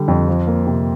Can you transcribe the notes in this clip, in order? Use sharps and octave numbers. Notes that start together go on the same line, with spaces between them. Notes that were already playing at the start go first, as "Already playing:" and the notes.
Already playing: D3 G3
F2
F3
A#3
C3